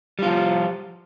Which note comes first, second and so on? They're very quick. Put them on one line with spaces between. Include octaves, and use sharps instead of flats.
G3 F4 F3